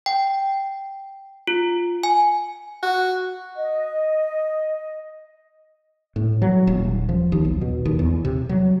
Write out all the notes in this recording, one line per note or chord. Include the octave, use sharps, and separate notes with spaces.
G5
F4
G#5
F#4
D#5
A2
F#3
D#1
F3
D#2
B1
B2
D#2
E2
C3
F#3